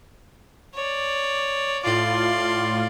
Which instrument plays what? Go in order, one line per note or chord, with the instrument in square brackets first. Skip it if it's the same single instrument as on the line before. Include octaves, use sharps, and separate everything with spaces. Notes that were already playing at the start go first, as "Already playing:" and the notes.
[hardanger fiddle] C#5 D5
[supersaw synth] A2 F4 [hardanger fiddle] D5 C6